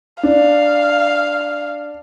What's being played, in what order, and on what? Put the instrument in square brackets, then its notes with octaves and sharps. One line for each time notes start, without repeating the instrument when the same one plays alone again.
[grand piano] D4 [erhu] F5